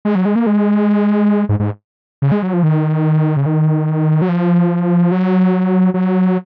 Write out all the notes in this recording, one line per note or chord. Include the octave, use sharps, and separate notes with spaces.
G#3
F#3
G#3
A#3
G#3
G#2
G#2
C#3
G#3
F#3
F3
D#3
C#3
D#3
F#3
F3
F#3
F#3